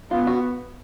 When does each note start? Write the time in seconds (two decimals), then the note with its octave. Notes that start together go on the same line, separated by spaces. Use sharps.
0.10 B3 F4
0.27 F#4